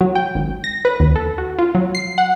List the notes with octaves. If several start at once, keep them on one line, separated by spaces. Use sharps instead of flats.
F#3
G5
G#1
A#6
B4
D#2
A4
F#4
F4
F#3
C7
F#5